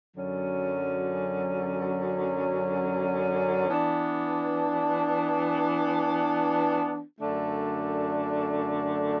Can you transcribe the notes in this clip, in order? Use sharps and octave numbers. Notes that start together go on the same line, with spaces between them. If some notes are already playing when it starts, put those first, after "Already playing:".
F#2 D3 F#3 C#4
E3 B3 D4
F#2 D3 A3 D4